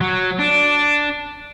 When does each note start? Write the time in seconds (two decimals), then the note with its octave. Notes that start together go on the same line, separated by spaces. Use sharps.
0.01 F#3
0.39 D4